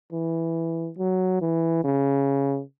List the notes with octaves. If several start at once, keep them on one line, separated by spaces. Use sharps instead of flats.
E3
F#3
E3
C#3